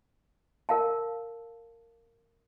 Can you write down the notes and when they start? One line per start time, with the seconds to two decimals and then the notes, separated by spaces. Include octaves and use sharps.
0.69 A#4 F5 A5